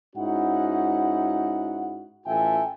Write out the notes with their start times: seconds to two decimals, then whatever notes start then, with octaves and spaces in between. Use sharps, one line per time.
0.16 G#2 C#4 D#4 E4 F#4 F#5
2.27 A1 F4 A4 E5 G5 G#5